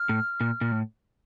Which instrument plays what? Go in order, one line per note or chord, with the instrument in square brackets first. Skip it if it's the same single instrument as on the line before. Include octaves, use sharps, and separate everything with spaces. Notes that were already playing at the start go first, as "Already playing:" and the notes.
Already playing: [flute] F6
[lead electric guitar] A2
A#2
A#2
A2